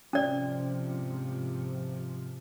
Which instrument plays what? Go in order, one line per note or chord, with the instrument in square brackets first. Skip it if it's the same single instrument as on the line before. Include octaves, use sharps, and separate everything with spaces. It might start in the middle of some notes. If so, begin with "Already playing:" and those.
[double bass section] G#2 C3 F3 [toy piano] C#4 D5